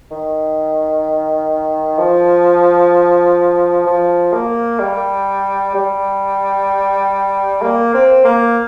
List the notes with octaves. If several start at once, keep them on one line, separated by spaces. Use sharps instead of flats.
D#3
F3
F3
A#3
G3
G3
A#3
C4
A#3